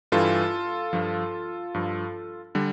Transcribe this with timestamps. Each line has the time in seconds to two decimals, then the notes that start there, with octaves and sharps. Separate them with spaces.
0.12 G2 E3 G3 F4 A4
0.93 G2 F3
1.74 G2 F3
2.55 D3 G3